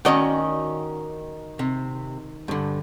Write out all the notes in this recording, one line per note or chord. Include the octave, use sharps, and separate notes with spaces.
D#3 C#4 F#4 D5 D#5
C3
G2 D3